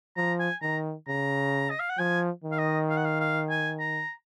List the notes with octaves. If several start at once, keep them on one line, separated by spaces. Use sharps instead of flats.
F3 A#5
G#5
D#3 A#5
C#3 A#5
D#5
F5
F#5
F3 G#5
D#3
F5
D#5
F5
F#5
F5
F5
G#5
A#5